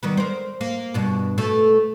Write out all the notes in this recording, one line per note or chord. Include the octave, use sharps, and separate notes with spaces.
D#3 G3 B3
A#4 C5
A#3
G2 B2 D4
B2 A3